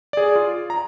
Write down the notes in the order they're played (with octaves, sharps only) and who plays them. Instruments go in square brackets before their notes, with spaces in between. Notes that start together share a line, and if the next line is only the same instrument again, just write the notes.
[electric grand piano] G#4 D5
F4
A#5